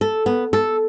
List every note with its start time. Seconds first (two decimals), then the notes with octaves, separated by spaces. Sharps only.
0.01 A4
0.26 B3
0.53 A4